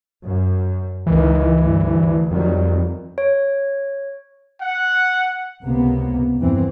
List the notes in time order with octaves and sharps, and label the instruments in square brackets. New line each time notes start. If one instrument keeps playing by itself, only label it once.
[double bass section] F#2
[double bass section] C#2 D#3 [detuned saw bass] E3
[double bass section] D2 G2
[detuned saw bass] F2 [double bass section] D#3 F#3 G3
[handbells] C#5
[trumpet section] F#5
[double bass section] C#2 C3 A#3 B3
E2 G2 E3 C4